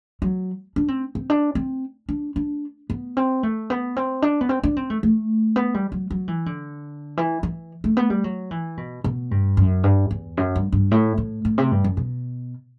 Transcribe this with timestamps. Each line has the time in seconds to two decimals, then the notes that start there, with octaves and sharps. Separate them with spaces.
0.22 F#3
0.76 D4
0.88 C4
1.15 C4
1.30 D4
1.55 C4
2.09 D4
2.36 D4
2.90 B3
3.17 C4
3.43 A3
3.70 B3
3.96 C4
4.22 D4
4.41 B3
4.49 C4
4.63 D4
4.77 C4
4.90 A3
5.03 A3
5.56 B3
5.74 G3
5.92 F#3
6.11 F#3
6.28 E3
6.46 D3
7.17 E3
7.43 E3
7.84 A3
7.97 B3
8.10 G3
8.24 F#3
8.51 E3
8.77 B2
9.04 B2
9.31 G2
9.57 F#2
9.84 G2
10.11 E2
10.37 F#2
10.56 G2
10.72 G2
10.91 A2
11.18 A2
11.45 A2
11.58 C3
11.71 G2
11.84 F#2
11.97 B2